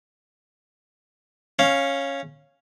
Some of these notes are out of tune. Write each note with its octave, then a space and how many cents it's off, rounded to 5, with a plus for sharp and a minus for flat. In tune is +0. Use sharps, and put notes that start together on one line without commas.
C#4 -5 F5 +0